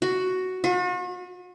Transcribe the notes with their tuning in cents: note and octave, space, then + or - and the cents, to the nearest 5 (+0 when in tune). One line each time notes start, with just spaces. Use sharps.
F#4 +5
F#4 -45